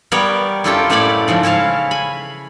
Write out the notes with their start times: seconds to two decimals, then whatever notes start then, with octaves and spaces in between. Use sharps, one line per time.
0.12 G3 B3 A#4 C#5 G5
0.64 F#2 E4 F4 G4 A4 G5
0.90 F#2 A2 C#5 D5 B5
1.28 G#2 C#3 F3
1.43 C#4 E4 C#5 F5 A5
1.91 G#5 B5